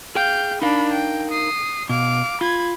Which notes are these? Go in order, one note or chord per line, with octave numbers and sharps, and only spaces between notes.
G#4 F5 G5 G6
D4 D#4 A#4 F5 B5
G5
D#6 C7
B2 F5 D6
F4 B5 G#6